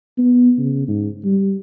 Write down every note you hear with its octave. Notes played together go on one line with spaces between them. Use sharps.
B3
C#3
G#2
G3